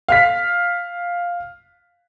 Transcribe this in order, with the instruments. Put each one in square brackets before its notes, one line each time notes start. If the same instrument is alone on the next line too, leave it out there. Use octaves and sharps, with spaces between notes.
[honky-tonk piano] F5 F6 B6